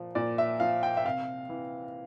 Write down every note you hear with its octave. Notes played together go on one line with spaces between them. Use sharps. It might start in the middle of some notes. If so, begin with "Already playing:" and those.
Already playing: A#2 F3
A#2 D5
E5
F3 F5
G5
E5
C3 F5
E3